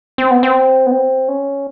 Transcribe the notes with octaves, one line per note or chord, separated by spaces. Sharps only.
C4
B3
C4
B3
C4
C#4